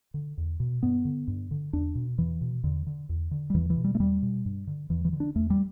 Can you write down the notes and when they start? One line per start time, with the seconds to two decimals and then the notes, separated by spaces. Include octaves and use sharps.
0.14 D3
0.38 E2
0.60 B2
0.83 G2 B3
1.05 D3
1.28 G2
1.51 D3
1.73 E2 D4
1.95 B2
2.18 E2 E3
2.41 B2
2.64 E2 D3
2.87 D3
3.09 E2
3.31 D3
3.50 G3
3.54 E2 E3
3.70 E3
3.77 B2
3.84 G3
3.95 A3
4.00 E2 G3
4.22 B2
4.46 G2
4.67 D3
4.90 E2 E3
5.05 E3
5.13 D3
5.20 D4
5.35 E2 A3
5.50 G3